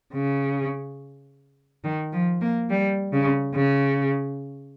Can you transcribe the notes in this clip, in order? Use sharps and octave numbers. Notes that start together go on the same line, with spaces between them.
C#3
D#3
F3
A#3
G3
C#3
C#3